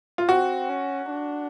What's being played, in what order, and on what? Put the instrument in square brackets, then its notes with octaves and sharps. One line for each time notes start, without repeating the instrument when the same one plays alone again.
[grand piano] F4
[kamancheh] C4 [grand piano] F#4
[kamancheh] C#4
D4